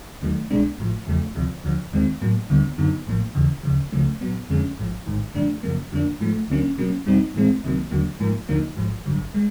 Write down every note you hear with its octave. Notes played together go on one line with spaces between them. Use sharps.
D#2 D#3 F#3 A3
C2 B2 G#3 B3 D4
A1 A2 F3
E2 C#3 F3 A3
D2 C3 F3
D2 D3 F3
D#2 D#3 G#3 C4
A2 F#3 A#3
D2 D3 G3 B3
F#2 D3 F#3 B3 D#4
A#1 A2 F3 A#3
D#2 C#3 E3
D2 C#3 F3
C#2 C#3 F3 A3 C#4
A#2 F#3 B3
F2 D3 F3 G#3 C#4
A1 G#2 F3
A1 G#2 D#3
G2 D3 F3 A3 D4
F#2 C#3 F3 A#3
F2 D3 F3 A#3 D4
G#2 F3 A3
D2 D3 F#3 A#3 C#4
B2 F#3 A#3 C#4
E2 B2 G3 C4 D#4
A2 E3 G#3 C4
C2 C3 D#3 F#3 A#3
D#2 D3 F#3 A#3
G#2 F3 A#3
D2 D3 F3 A#3 D#4
A1 G#2 F3
G#1 G2 D3 F#3
G#3